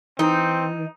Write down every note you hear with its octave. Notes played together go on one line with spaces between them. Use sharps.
E3 C4 D#4